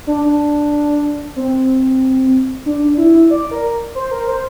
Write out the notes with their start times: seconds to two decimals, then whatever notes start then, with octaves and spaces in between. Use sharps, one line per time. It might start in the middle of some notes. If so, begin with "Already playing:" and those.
0.07 D4
1.36 C4
2.66 D4
2.97 E4
3.30 D5
3.51 A#4
3.95 C5
4.11 A#4
4.28 C5